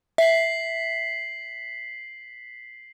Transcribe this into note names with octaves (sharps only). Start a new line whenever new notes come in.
E5 B6 C7 F#7